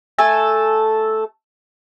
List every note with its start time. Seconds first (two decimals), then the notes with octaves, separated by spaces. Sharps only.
0.19 A3 A4 G#5